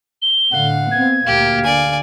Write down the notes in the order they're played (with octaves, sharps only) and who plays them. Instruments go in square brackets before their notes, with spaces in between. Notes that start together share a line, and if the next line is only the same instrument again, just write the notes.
[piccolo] G7
[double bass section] A2 D3 [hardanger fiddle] F5 [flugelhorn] F#5
[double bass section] B3 C4 [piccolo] G#6
[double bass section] D2 A#2 A#3 [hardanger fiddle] G4 [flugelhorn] F5
[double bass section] D3 [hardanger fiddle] D5 G#5